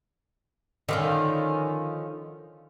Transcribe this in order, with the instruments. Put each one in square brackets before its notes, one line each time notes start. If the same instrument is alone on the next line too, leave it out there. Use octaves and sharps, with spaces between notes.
[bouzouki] D3 F3 C#4 [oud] D#3